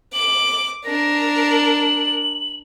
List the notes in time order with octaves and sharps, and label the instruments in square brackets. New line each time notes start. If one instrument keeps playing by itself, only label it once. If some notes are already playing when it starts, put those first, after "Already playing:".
[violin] D6 [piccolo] F#7
[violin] D4 A#4 [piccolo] A#6
[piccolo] F#7